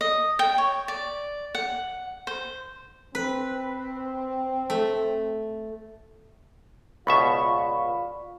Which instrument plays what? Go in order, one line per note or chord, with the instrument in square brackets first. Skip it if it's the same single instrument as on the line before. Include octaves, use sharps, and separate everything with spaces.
[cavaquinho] D#5
G5
C#5
D5
F#5
C5
[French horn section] C4 [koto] B4
[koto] A3
[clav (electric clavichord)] C#2 B2 E5 [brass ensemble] F4 D5 F5 [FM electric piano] B5 C#6